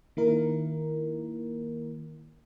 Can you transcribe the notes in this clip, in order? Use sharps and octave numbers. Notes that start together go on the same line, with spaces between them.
D#3 A#3 E4 A#4